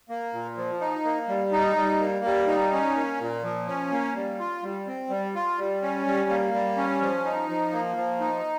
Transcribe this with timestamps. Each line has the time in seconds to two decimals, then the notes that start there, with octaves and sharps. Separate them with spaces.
0.09 A#3
0.33 A#2
0.57 F3
0.80 D#4
1.05 A#3
1.28 G3
1.52 D#4
1.76 G3
2.00 A#3
2.25 G3
2.47 D#4
2.72 C#4
2.96 A#3
3.20 A#2
3.43 F3
3.67 C#4
3.92 A#3
4.15 G3
4.39 F4
4.63 G3
4.87 C4
5.10 G3
5.35 F4
5.58 G3
5.82 C#4
6.06 G3
6.30 A#3
6.54 G3
6.77 C#4
7.01 F3
7.25 D#4
7.49 F3
7.73 A#3
7.96 F3
8.20 D#4